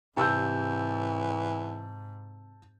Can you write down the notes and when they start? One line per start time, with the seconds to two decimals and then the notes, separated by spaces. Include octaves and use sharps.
0.17 G#2 C3 E3 A5 E6 G6